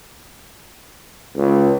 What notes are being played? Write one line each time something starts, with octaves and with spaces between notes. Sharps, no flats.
C#2